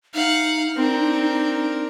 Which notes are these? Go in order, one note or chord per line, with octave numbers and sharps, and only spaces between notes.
D#4 F5 F#5
C4 D4 A#4